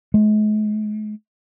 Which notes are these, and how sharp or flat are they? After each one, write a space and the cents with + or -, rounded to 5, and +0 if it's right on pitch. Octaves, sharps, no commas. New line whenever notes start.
G#3 +40